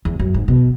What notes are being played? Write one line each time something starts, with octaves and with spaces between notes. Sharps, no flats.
E2
F#2
G#2
B2